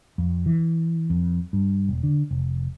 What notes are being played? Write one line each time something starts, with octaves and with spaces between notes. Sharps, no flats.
F2
E3
F2
G2
E1
D3
F1